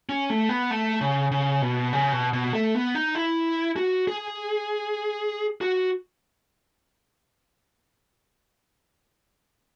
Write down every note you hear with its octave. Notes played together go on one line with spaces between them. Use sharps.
C#4
A3
B3
A3
C#3
C#3
B2
C#3
B2
B2
A3
B3
D#4
E4
F#4
G#4
F#4